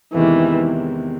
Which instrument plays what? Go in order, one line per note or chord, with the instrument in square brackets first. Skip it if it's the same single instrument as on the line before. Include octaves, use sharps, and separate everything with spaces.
[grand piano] E2 C3 D#3 G#3 [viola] E3